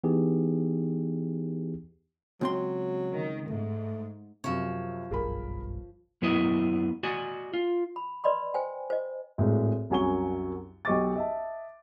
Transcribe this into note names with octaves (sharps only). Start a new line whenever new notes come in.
E3 B3 D#4 G4 G#4
C#2 F#3 C4 C6
D#3
G#2 A3
F#2 C3 F3 C#5
F#1 B1 G2 G#4 A#4 B5
F#2 F#3 B3 E4 D#5 E5
F#4 D5 D#5 G#5
F4
B5
B4 D5 D#5 B5 C6
C5 G5 G#5
C5 D#5
G#1 A2 G#3
C2 F#2 F#3 G#5 C#6 G7
B1 G4 D#5 C#6 D6 A6
D#5 E5 A5